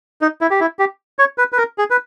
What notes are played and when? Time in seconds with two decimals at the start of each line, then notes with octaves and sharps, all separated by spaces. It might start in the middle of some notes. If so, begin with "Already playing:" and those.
0.21 D#4
0.41 E4
0.51 G4
0.60 E4
0.79 G4
1.19 C#5
1.38 B4
1.53 B4
1.58 A#4
1.78 G#4
1.90 B4